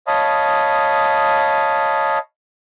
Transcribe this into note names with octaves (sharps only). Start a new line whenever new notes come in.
C#5 D#5 F5 A5 B5 D#6